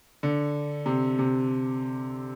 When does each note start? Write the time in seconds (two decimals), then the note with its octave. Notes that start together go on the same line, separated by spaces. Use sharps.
0.23 D3
0.86 C3
1.19 C3